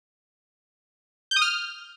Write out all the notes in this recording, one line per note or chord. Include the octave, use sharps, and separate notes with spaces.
G6
D#6
F6